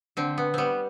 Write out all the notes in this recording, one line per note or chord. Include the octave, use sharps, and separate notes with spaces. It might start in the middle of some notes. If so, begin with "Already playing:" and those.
D3 C4
B3
G3 B3 C4